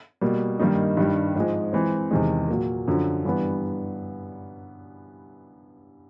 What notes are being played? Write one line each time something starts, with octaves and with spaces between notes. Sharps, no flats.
B2 G3 A#3
G2 D#3 G3 A#3 D#4
G2 D#3 G3
G#2 F3 G#3
E3 G#3 C4
E2 C3 D#3 G#3
A#2 F#3 A#3
F#2 D3 F3
G2 E3 G3 B3